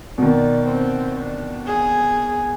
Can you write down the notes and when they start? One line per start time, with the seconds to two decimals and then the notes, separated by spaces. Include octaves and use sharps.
0.18 B2 D#3 D5
0.67 C4
1.20 D4
1.67 G#4